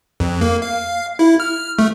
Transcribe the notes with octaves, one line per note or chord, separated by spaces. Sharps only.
F2
A#3
F5
E4
F6
A3